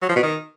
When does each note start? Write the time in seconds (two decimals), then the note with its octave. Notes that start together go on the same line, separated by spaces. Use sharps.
0.02 F#3
0.09 F3
0.16 B2
0.23 D#3